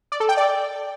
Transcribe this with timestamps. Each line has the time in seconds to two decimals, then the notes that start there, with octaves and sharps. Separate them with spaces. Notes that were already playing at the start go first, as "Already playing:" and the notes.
0.12 D5
0.20 A4
0.29 G5
0.37 D5